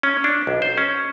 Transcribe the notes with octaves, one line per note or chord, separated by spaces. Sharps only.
C#4
D4
B1
C5
C#4